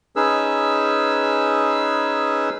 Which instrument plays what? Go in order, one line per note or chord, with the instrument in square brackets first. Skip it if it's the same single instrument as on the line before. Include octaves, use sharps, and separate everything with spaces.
[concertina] C#4 D#4 G#4 B4 E6